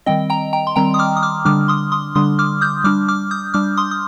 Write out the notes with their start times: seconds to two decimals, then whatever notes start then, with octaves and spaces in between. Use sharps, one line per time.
0.06 D#3 G3 C4 D#5 G5
0.30 G5 A#5
0.53 G5 A#5
0.67 C6
0.76 D#3 G3 C4 G5 A#5
0.94 D#6
0.99 D6 F6
1.17 D#6
1.23 D6 F6
1.45 D3 G3 D4 D6 F6
1.68 C6 D#6
1.92 C6 D#6
2.15 D3 G3 D4 C6 D#6
2.39 D6 F6
2.61 D#6 G6
2.84 G3 D4 D6 F6
3.08 D6 F6
3.31 D#6 G6
3.54 G3 D4 D6 F6
3.77 C6 D#6
3.91 D#6